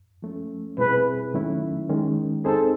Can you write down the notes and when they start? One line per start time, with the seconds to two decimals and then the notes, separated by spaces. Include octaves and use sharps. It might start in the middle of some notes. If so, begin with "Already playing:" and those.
0.23 F3 A3 C#4
0.78 B2 G3 C4 E4 G#4 B4
1.34 D#3 F#3 A3 C#4 E4
1.89 D#3 G#3 C#4
2.45 C4 D#4 G#4 A4 C5